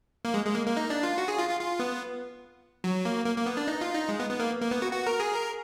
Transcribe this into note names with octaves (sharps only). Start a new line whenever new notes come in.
A#3
G#3
G#3
A#3
A#3
D#4
D4
F4
F#4
G#4
F4
F4
F4
B3
F#3
A#3
A#3
A#3
B3
D4
D#4
F4
D#4
G#3
B3
B3
A#3
A#3
B3
F#4
F#4
A#4
G#4
A#4